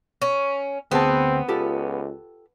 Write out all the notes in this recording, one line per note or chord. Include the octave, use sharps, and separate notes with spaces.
C#4
D2 B3 C4 G#4 A5
C#2 F4 G4 A4